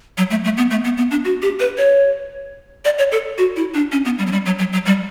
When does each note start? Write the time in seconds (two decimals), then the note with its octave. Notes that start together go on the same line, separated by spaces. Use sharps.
0.18 F#3
0.31 A3
0.44 A3
0.57 B3
0.71 A3
0.84 B3
0.97 B3
1.11 D4
1.25 F#4
1.42 G4
1.60 B4
1.78 C#5
2.85 D5
2.98 C#5
3.12 A4
3.38 F#4
3.56 E4
3.74 D4
3.92 C#4
4.05 B3
4.18 G3
4.27 F#3
4.32 G3
4.46 F#3
4.59 F#3
4.73 F#3
4.86 G3